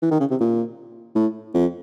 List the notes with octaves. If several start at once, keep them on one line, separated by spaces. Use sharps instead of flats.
E3
D#3
C#3
C3
A#2
A2
F2